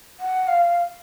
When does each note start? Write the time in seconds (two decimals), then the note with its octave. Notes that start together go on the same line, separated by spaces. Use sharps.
0.20 F#5
0.48 F5